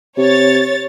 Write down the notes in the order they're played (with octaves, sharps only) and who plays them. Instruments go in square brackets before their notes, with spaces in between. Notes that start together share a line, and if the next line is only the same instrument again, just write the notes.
[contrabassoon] C3 [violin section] C#5 A6